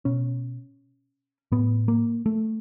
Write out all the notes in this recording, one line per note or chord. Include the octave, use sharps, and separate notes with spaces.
B2 C#4
A2 B3
A#3
A3